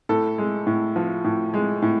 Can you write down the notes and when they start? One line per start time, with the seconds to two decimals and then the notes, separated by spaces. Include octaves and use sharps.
0.09 A2 A4
0.38 G#3
0.67 A2
0.96 F3
1.25 A2
1.54 G#3
1.82 A2